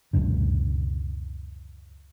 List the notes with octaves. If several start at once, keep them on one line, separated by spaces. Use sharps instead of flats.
C#2 F#2 B2 D3